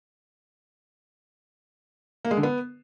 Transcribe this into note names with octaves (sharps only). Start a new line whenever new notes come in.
A#3
G#3
D3
B3